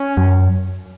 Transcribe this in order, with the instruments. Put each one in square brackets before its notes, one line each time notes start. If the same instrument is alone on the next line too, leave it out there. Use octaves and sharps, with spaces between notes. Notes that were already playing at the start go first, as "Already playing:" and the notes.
Already playing: [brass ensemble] C#4
[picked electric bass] F#2